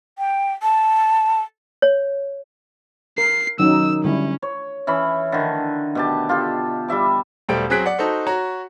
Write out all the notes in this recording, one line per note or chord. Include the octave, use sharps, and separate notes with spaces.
G5
A5
C#5
A#4 C7
D#3 F#3 C#4 D#4 E6
D3 G3 C#4 E4
C#5
E3 C#4 E5 B5
D3 D#3
B2 G4 A5
F4 G4 A4
G3 G4 E5 D6
E1 G3 A3 C5 G5 D7
F#3 C4 G#4 F#6 B6 D7
D5 F#5
D#4 F#4 A4 C5
F#4 C#5 A#5